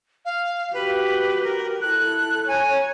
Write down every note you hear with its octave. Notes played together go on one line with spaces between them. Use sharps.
F5
F#4 G4 B4
A#4
E4 A4 F#6
C#5 G#5 A#5